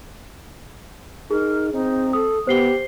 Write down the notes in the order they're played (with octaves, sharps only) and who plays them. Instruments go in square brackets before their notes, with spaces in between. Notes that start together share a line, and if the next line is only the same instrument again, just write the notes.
[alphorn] D#4 [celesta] G#4 [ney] A#4
[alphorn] C4 [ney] D#4
[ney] A4 [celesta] D#6
[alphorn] B3 [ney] G4 [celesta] C5 C7 G7